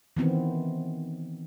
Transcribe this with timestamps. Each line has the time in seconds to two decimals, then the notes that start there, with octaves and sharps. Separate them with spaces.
0.17 D#3 E3 B3 C4